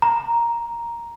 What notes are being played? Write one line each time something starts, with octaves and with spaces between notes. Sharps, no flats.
A#5